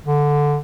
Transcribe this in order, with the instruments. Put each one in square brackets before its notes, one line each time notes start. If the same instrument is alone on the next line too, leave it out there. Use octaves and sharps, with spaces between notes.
[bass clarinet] D3